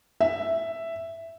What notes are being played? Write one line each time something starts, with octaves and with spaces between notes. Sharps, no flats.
E5